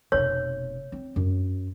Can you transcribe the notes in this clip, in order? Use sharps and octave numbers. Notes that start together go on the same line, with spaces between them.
F1 B2 C#5
C4
F#2